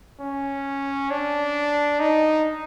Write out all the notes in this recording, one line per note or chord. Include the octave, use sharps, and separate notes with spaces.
C#4
D4
D#4